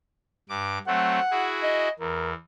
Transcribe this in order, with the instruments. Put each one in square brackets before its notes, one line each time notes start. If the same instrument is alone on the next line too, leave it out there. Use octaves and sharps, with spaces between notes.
[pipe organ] G2 D6
[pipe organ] F#3 A3 C4 [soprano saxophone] F#5
[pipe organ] E4 F#4 G#4
[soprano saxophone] D#5
[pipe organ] E2 [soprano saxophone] A#4